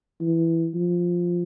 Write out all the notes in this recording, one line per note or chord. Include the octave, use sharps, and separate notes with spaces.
E3
F3